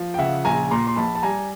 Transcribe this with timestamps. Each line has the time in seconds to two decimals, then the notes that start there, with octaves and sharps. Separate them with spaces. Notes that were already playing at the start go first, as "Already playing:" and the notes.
Already playing: F3
0.14 G5
0.18 C#3 E5 F#5
0.45 A#1 G#5 A#5
0.71 A#2 A#5 C6
0.87 C6
0.96 A#1 A5 B5
1.15 A5
1.23 G3 G#5 A#5